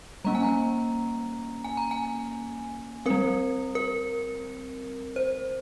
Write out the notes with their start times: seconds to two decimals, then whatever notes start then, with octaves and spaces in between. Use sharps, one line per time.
0.25 G3 A#3 C#4 A#5
0.35 G#5
0.43 A#5
1.64 G#5
1.77 A#5
1.91 G#5
3.06 G3 C4 A#4
3.75 A#4
5.16 C5